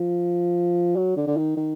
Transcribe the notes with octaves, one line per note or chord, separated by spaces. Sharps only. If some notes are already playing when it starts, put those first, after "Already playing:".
Already playing: F3
F#3
D3
D3
D#3
D#3